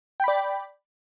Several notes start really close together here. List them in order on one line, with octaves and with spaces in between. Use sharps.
G5 B5 D5